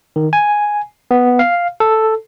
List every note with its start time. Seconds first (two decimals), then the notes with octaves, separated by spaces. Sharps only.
0.16 D#3
0.33 G#5
1.11 B3
1.39 F5
1.80 A4